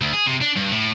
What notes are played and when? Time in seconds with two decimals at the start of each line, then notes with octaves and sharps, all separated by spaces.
0.01 D2
0.14 G#4
0.27 C3
0.42 D4
0.56 G2
0.72 A2